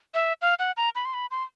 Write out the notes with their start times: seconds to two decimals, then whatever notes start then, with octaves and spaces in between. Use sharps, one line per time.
0.14 E5
0.42 F5
0.59 F#5
0.77 A#5
0.95 B5
1.05 C6
1.14 B5
1.31 C6